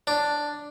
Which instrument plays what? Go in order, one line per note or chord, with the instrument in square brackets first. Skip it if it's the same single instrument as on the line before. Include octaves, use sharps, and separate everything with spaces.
[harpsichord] D4